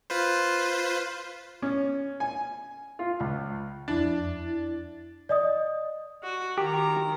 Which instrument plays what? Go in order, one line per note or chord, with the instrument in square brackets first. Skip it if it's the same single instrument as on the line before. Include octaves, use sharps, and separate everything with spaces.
[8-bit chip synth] F4 B4 C5
[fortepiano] C#4
G#5
F4
C#2
[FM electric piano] F2 E4 A6 [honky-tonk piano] D4
[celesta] D5 D#5 D#6
[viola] F#4
[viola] D#3 A#5 [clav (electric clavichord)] G4